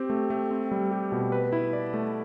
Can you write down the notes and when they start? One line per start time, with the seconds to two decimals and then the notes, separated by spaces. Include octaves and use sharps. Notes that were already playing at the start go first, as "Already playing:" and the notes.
Already playing: C4 G4
0.10 A3
0.30 A3
0.51 C4
0.71 G3
0.91 G4
1.12 B2
1.32 B4
1.52 E4
1.73 D5
1.94 A3